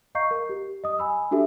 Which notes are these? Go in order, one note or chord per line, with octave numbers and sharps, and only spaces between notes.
D#5 F5 A#5 C#6 G6 C7
A#4
G4
D#5 D#6
G#5 B5 E6
D4 F#4 G4 A4 E5